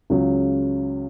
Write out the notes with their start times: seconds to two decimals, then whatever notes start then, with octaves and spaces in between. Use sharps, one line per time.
0.10 C#2 C#3 F#3